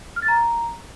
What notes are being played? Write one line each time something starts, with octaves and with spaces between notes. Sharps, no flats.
F6
A6
A#5